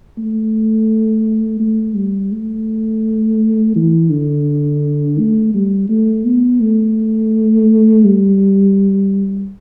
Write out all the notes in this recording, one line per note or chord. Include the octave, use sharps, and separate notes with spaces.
A3
A3
G3
A3
E3
D3
A3
G3
A3
B3
A3
G3